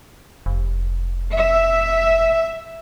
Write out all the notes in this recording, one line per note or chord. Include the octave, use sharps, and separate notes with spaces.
F1
E5